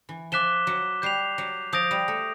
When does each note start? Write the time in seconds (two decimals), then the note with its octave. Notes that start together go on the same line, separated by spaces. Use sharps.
0.09 E3
0.32 F3 D6 F#6 B6 E7 G7
0.67 F#3
1.02 G3 G6 C7 F7
1.38 F#3
1.73 F3 D#6 G6 A#6 D7 F7
1.91 G3
2.08 A3